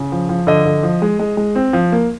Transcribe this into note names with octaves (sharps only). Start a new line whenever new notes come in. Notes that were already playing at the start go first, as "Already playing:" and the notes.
Already playing: C#3
F3
F3
D3 D#5
D3
F3
G#3
G#3
G#3
C4
F3
A#3